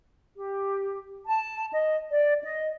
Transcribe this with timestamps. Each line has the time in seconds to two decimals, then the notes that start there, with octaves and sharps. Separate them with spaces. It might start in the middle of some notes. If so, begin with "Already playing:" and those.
0.36 G4
1.26 A5
1.73 D#5
2.11 D5
2.43 D#5